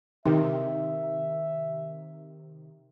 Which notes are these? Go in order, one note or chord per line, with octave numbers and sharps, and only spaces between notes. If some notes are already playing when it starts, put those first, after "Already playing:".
C3 D#3 D#4 E5